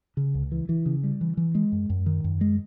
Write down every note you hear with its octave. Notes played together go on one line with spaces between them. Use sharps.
C#3
C#2
E3
E3
C#3
G3
E3
E3
G#3
F#2
F#2
D#3
F#2
G#3